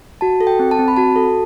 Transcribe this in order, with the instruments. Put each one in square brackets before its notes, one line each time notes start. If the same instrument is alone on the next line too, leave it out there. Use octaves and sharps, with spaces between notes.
[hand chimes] F#4 A5
A4
G5
C4
A5
C4
B5
F#4 A5
A4